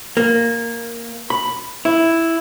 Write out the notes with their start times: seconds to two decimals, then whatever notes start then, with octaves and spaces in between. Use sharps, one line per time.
0.17 A#3
1.30 B5
1.85 E4